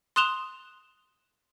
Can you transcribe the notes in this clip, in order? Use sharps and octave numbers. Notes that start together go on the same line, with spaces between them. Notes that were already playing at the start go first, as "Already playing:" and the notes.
C6 D#6 F#6 E7 F7 G7